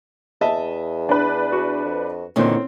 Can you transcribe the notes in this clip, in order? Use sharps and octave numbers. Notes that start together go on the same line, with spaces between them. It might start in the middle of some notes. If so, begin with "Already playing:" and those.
E2 D#5 E5 A5
D4 B4
F#4
F2
E2 A#2 D3 D#3 C4 C#4